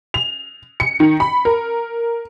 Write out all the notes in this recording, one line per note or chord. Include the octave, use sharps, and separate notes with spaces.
F7
C#7
D#3
B5
A#4